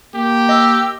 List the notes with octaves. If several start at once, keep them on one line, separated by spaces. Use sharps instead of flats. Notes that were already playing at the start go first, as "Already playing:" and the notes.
A#3 G4
D#5 E6